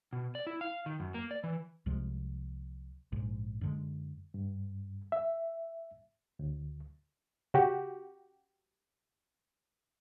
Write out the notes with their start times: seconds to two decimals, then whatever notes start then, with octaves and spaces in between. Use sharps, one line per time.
0.13 B2
0.35 D5
0.47 E4
0.61 F5
0.86 D#3
1.00 F#2
1.14 A#3
1.31 D5
1.44 E3
1.86 C2 C3 F3 G#3
3.12 A#1 G#2
3.61 F#2 D3 G#3
4.34 G2
5.12 E5
6.39 D2
7.54 C#3 F#4 G4